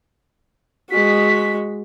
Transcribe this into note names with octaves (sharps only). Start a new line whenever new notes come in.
G#3 F#4 B6